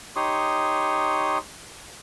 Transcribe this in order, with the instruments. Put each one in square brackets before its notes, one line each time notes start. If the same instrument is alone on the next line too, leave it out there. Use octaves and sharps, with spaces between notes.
[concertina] D#4 G4 C#5 C6 C#6 D#6